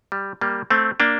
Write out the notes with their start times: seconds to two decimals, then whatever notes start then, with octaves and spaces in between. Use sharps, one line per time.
0.12 G3
0.41 G3 A#3
0.70 A3 C4
1.00 A#3 D4